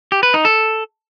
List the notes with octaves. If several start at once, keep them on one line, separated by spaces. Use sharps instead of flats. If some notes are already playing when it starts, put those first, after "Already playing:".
G4
B4
D#4
A4